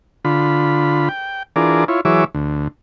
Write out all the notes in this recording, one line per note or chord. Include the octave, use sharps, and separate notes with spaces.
D3 F4 B5
G5
E3 D4 F4 G#4 A#4 D5
E4 F4 C#5
E3 F#3 G#4 C#5 E5 D6
D2